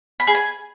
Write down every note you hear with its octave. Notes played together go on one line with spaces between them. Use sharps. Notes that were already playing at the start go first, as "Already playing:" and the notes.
B5
G#4
G#5